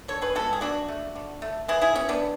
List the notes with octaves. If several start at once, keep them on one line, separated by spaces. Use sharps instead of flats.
D3 A4 C#5
G#4 B4
G#3 B3 F#4 A4
G#4
D3 D4 F#4
A3
D3
A3
E3 E4 G#4
E4 G#4
B3 C#4
B3 D4